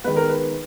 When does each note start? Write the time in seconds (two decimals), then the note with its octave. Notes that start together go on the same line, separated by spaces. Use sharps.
0.04 D#3 G#3 B3 B4
0.16 A#4
0.29 B4